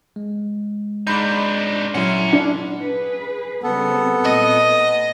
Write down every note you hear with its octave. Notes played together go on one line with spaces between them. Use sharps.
G#3
G#2 D4 D#4 B5 G6
A#2 F#3 C#4 E4 F#5 A#5 C6
D4
G#4 B4
C#3 G3 B3 C4 A4
A#2 D#5